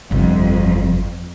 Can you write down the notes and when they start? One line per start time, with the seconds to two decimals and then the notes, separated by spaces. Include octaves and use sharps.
0.11 G1 F2 C3